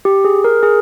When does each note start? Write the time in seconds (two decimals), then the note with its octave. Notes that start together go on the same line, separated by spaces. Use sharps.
0.05 G4
0.25 G#4
0.44 A#4
0.63 G#4